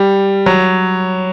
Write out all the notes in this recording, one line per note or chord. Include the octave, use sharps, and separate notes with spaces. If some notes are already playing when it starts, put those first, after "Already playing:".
Already playing: G3
F#3